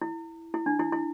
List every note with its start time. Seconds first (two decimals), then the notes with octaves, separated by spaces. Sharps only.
0.02 E4
0.54 E4
0.66 D4
0.80 E4
0.93 E4